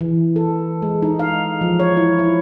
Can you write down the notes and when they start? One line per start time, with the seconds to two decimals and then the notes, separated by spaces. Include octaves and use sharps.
0.01 E3
0.36 A4
0.82 G#3
1.02 D#4
1.19 F5
1.61 F3
1.80 C#5
1.97 E4
2.19 E4